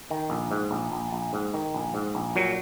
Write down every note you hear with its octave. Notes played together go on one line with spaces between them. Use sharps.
D#3
A#1
G#2
A#1
A#1
A#1
G#2
D#3
A#1
G#2
A#1
A#2 F#3